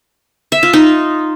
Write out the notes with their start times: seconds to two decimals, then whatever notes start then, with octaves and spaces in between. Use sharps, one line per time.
0.52 E5
0.63 F4
0.73 D#4